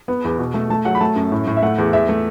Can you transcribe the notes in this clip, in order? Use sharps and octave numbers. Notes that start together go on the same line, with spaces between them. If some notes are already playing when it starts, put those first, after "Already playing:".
B3
E2
B2
A3
A3 A5
F#3 F#5
B5
A3 A5
F#2
A2
A2
E5
A3 F#5
E2
E2 E5
A3